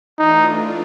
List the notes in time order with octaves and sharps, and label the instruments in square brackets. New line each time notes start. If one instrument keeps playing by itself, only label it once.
[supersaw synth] E3 A3 D4 F4 [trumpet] D#4